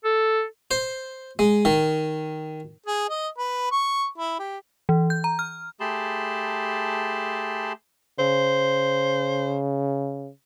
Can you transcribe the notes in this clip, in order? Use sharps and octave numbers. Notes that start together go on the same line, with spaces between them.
A4
C5
G#3
D#3
G#4
D#5
B4
C#6
E4
G4
E3
G6
A#5
F6
A3 G4 G#4 A5 B5 C6
C#3 C5